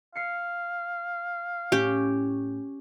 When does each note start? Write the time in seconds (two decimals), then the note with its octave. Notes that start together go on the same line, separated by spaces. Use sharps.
0.15 F5 C7 C#7
1.72 A2 C#4 G4